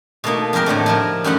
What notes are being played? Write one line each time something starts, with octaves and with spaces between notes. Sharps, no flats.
B2 A3 A#3 D#4
F2 G#3 G4 A#4 G5
A2 D3 F3 A3
F3 E4 A#4
F#2 G3 A3 D#4 F#4 F#5